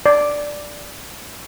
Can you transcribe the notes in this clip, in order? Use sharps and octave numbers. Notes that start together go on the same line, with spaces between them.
D5